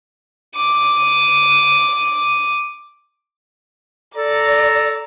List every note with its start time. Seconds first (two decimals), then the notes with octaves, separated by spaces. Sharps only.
0.56 D6 D#7
4.16 A4 D5 A#5